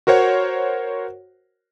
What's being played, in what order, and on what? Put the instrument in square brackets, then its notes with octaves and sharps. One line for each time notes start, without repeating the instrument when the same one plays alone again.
[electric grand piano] F#4 A#4 C5 C#5 F#5